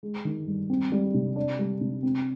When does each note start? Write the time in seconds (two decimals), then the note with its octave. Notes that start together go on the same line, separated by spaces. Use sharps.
0.03 G#3
0.25 D#3
0.47 G2
0.70 C4
0.92 G3
1.14 C3
1.36 D4
1.59 G3
1.81 C3
2.03 C4